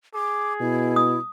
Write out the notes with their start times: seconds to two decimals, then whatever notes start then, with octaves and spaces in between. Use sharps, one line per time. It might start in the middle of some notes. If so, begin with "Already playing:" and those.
0.14 G#4 D6
0.61 B2 E4
0.96 D#6